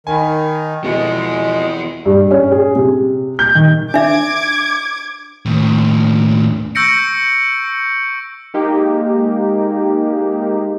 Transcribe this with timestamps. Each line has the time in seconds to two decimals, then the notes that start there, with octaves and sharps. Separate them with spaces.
0.07 D#3 G#5 B5
0.84 F2 B2 G#3 B3 E4
2.06 G2
2.31 C#4
2.51 G#4
2.75 C3
3.39 G6
3.55 D#3
3.94 D4 E5 D6 G#6
5.46 D#2 A2
6.75 C#6 E6 G6 A#6 C#7 D7
8.54 G#3 A#3 D#4 G4